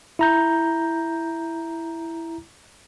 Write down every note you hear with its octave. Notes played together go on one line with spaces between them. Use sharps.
E4 A#5 G6